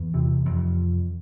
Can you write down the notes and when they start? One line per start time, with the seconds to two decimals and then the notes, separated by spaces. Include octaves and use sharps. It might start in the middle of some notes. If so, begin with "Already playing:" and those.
Already playing: E2 E3
0.14 C3
0.46 F2